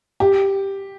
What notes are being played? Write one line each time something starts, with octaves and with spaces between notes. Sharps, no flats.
G4